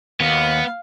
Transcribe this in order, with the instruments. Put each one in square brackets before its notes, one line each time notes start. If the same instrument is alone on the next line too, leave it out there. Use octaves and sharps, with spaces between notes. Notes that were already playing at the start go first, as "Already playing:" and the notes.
[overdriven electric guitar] D#2 [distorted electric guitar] B3 [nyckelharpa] F5